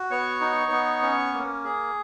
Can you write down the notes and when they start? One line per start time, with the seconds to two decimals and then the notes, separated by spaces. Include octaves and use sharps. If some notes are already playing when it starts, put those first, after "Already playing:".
Already playing: F#4
0.11 B3 C#5 C#6
0.41 D#4
0.71 B3
1.02 C#4
1.34 A#3
1.64 G#4